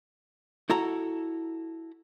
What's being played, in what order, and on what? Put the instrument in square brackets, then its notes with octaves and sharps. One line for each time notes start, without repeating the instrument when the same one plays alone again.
[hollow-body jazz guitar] E4 F#4 A4 A#5